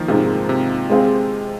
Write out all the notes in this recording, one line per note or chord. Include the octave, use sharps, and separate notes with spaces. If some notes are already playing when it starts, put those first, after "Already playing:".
Already playing: D#3 F3 A#3
G#2 C3 G#3 C4 F4
C3
G#3 C4 G#4 F5